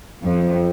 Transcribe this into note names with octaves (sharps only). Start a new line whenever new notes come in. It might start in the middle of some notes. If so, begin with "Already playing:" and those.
F2